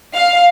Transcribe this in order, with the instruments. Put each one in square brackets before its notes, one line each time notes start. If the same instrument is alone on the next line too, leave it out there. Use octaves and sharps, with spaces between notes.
[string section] F5